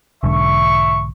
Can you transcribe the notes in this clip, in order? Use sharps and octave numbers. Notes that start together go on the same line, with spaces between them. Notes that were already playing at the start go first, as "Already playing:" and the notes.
B1 G#2 D3 E5 C#6